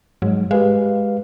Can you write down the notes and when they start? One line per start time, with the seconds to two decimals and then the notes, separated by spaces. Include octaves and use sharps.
0.22 G#2 F#3 G#3
0.51 G#3 G4 B4 F5